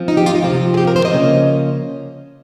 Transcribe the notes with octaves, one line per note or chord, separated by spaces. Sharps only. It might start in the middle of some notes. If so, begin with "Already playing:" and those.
Already playing: F3 C4
D#4
G4
F4
D#4
C3 F3 C4 F4
G#4
G4
A#4
C5
D#5
C#3 F3 A#3 C#4